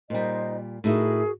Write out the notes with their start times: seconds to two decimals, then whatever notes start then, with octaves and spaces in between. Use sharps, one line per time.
0.10 A#2 G3 D#4 C5 D#5
0.84 A2 D#4 E4 F#4 G#4 A#4